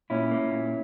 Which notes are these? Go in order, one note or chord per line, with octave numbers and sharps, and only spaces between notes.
A#2 C#4 E4
A#3
A#2